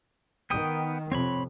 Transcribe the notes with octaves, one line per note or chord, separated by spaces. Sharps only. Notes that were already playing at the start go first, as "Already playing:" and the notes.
D#3 B3 G5 D#6
F2 C3 C4 C#5 B5